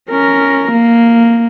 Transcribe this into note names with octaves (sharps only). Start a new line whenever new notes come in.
C#4 A#4
A#3